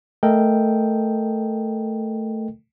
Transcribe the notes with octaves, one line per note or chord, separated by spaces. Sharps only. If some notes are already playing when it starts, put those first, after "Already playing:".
A3 A4 A#4 D#5 G5